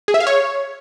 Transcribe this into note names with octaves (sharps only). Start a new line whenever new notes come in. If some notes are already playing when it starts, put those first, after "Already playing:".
G#4
E5
F5
C#5